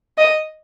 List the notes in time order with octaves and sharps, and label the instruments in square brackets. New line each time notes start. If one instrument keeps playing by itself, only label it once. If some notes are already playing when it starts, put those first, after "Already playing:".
[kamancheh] D#5